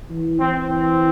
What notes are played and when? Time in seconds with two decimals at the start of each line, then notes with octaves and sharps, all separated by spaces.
0.10 E3
0.40 E3 C4
0.70 C4